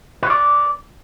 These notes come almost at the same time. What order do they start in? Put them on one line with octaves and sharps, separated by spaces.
B4 C#5 D5